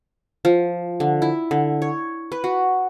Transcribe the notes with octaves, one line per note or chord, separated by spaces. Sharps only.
F3
D3
E4
D3
C#5
B4
F#4